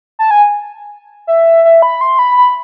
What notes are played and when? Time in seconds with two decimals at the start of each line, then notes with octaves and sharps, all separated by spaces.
0.19 A5
0.31 G#5
1.27 E5
1.65 E5
1.82 B5
2.01 C6
2.19 B5
2.37 B5